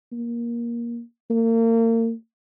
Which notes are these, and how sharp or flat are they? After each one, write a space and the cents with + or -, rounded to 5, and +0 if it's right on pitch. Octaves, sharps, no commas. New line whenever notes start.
A#3 +15
A#3 -35